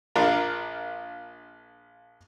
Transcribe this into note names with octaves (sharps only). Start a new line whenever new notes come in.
A#1 D4 F4 A#4